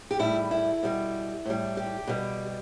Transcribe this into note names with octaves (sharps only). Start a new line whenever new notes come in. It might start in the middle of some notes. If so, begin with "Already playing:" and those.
G4
A2 G3 E4
E4
B2 G3
A2 G3
G4
B2 G3